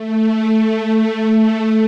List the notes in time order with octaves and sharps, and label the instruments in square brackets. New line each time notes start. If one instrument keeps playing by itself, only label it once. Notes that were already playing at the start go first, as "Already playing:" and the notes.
Already playing: [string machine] A3